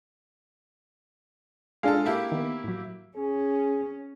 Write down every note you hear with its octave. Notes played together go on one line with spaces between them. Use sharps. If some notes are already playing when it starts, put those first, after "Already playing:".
G#3 D4 F4 G#4 A4 F5
A#3 E4 G4
D#3 B3
A2 F#3
C#4 G#4